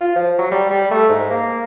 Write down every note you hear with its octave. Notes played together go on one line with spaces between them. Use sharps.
F4
F3
F#3
G3
G3
A3
G#2
A#3